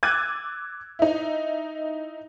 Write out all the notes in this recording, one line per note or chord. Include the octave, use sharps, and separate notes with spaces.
D6 E6 F#6 G#6 A6 D#7
D#4 E4